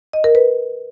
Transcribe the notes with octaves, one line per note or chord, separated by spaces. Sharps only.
D#5
A#4
B4